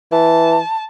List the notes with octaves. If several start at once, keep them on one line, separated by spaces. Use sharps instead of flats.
E3 A5